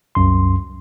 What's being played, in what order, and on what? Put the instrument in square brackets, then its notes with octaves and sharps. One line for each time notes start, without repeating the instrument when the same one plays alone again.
[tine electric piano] C2 F#2 C6